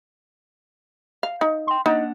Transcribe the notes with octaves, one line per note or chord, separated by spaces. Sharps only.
F5
D#4
G5 C6
A#3 D4 D#4 F#5